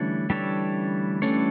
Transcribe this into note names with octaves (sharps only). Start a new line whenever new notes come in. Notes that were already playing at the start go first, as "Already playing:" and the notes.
Already playing: D3 E3 G3 A3 C#4 D4 A4 C#5
E3 G3 D4 A4 C#5
E3 G3 A3 C#4 D4 A4 C#5